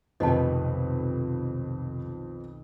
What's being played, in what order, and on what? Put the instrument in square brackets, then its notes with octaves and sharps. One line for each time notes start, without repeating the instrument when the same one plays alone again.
[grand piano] F1 [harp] B1 B2 D#3 [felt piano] F2 B4 [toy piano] D#5 A5